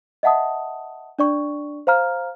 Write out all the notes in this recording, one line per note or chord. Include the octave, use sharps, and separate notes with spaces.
D#5 E5 F#5 A5 D#6
D4 D5 C#6
C5 F5 A#5 F6